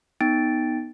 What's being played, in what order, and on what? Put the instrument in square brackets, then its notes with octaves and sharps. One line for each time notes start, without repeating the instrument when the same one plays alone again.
[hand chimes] B3 D#4 G5 A6 D7